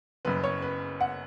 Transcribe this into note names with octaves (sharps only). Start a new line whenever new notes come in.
F#1 F#2 C#3 B4
C#5
B4
F#5